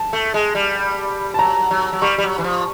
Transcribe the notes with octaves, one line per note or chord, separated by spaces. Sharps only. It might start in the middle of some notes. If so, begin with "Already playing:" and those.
Already playing: A5
A3
G#3
G3
A5
F#3 A#5
F#3
F#3
G3 C#6
G3
F#3
E3
F3